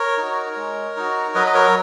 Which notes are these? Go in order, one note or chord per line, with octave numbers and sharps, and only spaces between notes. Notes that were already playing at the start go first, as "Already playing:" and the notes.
Already playing: A#4 C#5
D#4 F#4
G#3
D#4 F#4
F#3 B4 D#5
D#5
A#4 C#5